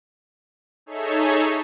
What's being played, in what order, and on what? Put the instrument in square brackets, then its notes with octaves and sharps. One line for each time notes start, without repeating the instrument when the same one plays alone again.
[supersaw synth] D#4 G#4 A4 C#5 E5